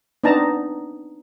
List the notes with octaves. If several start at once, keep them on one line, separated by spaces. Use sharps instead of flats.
B3 C4 D4 D#4 A5 A#5